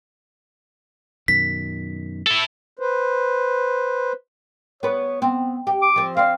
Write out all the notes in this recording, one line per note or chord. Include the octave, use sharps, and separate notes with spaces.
F#2 B2 D#3 B6
E4 A4
B4 C5
B3 B4 C#5
B3 C4
G4
D6
F3 C4
C4 D4 F5